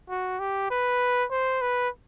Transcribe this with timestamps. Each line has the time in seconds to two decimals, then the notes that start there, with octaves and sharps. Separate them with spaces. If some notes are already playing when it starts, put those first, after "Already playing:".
0.10 F#4
0.40 G4
0.70 B4
1.31 C5
1.61 B4